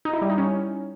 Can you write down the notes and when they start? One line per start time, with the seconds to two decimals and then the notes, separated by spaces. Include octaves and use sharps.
0.05 D#4
0.13 E4
0.22 G3
0.30 D#4
0.38 C#4